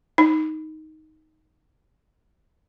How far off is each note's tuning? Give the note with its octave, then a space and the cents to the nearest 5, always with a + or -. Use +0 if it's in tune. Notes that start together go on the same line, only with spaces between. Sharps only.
D#4 +10